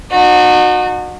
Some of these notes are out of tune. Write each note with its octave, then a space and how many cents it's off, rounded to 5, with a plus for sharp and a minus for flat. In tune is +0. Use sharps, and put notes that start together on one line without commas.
D#4 -45 F#4 -25